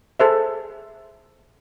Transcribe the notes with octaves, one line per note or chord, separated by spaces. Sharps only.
G#4 A4 C5 E5